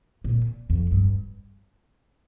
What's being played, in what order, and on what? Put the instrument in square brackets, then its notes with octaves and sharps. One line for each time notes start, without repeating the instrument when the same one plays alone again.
[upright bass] A#2
F2
G2